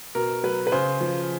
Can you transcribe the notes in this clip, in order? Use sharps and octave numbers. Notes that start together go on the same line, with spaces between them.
B2 A#4
F#3 B4
B4
C#3 C5
F3